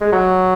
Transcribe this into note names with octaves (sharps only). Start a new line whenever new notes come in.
G#3
F#3